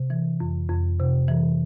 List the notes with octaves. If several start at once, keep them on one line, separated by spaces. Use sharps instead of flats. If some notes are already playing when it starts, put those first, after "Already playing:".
Already playing: C3
E3
F2
F2
C3
E3